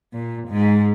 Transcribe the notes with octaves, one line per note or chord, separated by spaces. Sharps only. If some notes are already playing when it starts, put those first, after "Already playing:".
A#2
G#2